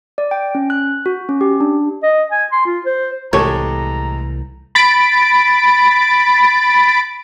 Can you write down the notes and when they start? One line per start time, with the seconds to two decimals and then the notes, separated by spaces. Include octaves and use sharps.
0.18 D5
0.31 G5
0.55 C#4
0.70 F#6
1.06 F#4
1.29 C#4
1.41 G4
1.60 D4
2.03 D#5
2.32 G#5
2.52 C6
2.66 F4
2.86 C5
3.33 C2 A2 E3 G#3 G4 A4 C#5 A#5
4.75 B5 A6 B6 D7